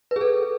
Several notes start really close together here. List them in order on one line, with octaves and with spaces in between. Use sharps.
B4 G#4 A4